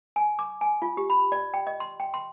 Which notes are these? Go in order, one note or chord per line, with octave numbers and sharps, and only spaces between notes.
G#5
D6
G#5
F4
G4
B5
D5
G5
D#5
C6
G5
C6